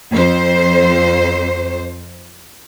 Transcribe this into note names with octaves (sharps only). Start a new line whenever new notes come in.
F2 C5